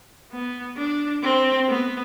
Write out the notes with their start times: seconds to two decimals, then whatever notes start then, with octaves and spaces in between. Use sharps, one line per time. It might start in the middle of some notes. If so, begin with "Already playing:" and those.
0.32 B3
0.77 D4
1.23 C4
1.68 B3